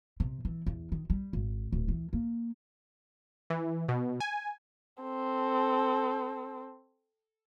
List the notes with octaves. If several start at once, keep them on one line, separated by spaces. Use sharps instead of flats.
C3
E3
E2
D#3
G3
G#1
D1
E3
A#3
E3
B2
G#5
C4 A4